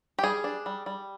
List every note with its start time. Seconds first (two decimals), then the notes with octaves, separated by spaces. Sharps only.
0.19 G4
0.23 G3 G#4
0.44 D4
0.66 G3
0.86 G3